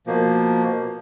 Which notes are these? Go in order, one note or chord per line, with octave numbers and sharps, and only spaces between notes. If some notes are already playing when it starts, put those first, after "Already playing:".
B2 F3 A#3